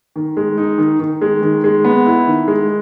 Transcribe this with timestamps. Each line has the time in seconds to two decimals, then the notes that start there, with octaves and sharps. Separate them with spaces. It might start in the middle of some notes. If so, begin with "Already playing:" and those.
0.16 D#3
0.37 G#3
0.58 D#4
0.78 D#3
1.00 D#3
1.22 G#3
1.42 D#3
1.64 G#3
1.85 B3
2.06 E4
2.27 D#3
2.48 G#3